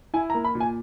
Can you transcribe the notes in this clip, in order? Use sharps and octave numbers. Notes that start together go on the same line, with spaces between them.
E4 G#5
A#5
A#3
B5
A#2
G#5